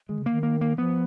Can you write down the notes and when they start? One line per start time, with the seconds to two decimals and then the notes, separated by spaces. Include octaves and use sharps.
0.09 D#3 G#3
0.19 C#3
0.26 D#3 A#3
0.43 A#3
0.61 A#3
0.78 F3 B3